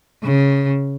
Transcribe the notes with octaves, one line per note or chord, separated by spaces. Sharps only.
C#3